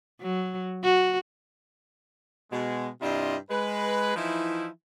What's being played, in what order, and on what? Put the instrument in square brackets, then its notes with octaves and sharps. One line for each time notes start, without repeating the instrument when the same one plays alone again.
[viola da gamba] F#3
F#4
[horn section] B2 G#3
G2 C3 D4 E4 F4 D#5
G#3 B4
E3 F3 D#4 E4